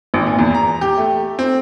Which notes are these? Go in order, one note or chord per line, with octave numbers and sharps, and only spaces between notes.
G#1
A#2
E2
A#5
G4
A3
C4